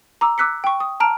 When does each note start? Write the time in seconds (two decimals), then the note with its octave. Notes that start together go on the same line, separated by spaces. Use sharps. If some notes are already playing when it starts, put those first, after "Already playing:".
0.21 A#5 D6 E6
0.38 D6 E6 F#6 B6 C#7
0.64 G5 C#6
0.80 D#6
1.00 A5 A#5 F6 D7